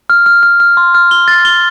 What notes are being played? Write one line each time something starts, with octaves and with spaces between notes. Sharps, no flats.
F6
F6
F6
F6
C6
F6
G7
A6
G7